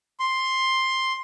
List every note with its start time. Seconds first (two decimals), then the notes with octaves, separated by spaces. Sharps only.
0.20 C6